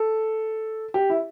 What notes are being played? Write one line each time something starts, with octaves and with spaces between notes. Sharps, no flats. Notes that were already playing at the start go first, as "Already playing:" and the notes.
Already playing: A4
G4
E4